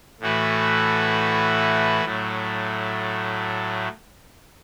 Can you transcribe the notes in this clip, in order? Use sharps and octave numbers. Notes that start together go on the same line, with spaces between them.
A2 E3 A3 F#4 B4
A2 F#3 A3